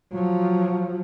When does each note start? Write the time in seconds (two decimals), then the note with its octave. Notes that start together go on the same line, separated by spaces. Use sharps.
0.13 F3 F#3